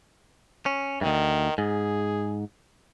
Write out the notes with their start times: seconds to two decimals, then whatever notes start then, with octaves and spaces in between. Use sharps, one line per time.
0.66 C#4
1.01 D2 G2 D#3
1.58 G#2 G#4